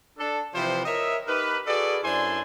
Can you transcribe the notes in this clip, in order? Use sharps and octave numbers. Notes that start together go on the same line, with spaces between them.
D4 A4
C3 E3 F3 G4 B4 C5
A#4 C#5 D#5 E5
D#4 G4 A#4 B4
F#4 G#4 A4 B4 D5
F#2 D4 E4 C5 G#5 C6